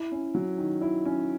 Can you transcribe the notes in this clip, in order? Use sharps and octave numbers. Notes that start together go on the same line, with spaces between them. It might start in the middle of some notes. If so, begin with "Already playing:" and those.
Already playing: E4
C#4
F#3
D#3
E4
C#4